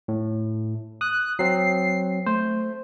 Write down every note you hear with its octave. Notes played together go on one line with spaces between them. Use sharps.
A2
D#6 F#6
F#3 C4 C7
A3 C5